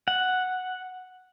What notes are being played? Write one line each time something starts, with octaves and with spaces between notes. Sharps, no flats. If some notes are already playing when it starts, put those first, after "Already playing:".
F#5